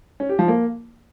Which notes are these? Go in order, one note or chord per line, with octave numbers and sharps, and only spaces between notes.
C#4
G4
F3
A#3